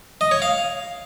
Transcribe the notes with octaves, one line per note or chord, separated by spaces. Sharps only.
D#5
C#5
F5